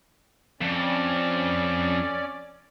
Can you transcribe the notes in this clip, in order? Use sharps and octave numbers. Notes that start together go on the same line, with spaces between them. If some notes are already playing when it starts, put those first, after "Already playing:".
F2 C#4 D5